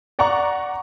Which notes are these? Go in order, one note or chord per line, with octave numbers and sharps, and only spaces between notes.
D5 F#5 A#5 C#6